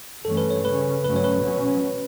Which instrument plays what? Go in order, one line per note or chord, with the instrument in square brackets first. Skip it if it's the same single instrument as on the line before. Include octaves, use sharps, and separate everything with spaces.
[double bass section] G2 E3 A3 C#4 [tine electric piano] A4
[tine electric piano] B4
C#5
[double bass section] C#3 G3 C#4 [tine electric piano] B4
[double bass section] G2 F#3 A3 C#4 [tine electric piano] B4
[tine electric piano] C#5
B4
[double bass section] B2 F#3 C#4